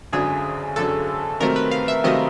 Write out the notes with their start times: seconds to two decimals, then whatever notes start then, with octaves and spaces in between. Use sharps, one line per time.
0.13 G#1 F#2 D3 F#3 G#4
0.76 G#1 F#2 D3 F#3 A4
1.40 C3 D#3 F#3 A3 C4 A#4
1.56 B4
1.71 F5
1.88 E5
2.04 C3 D#3 F#3 A3 C4 D#5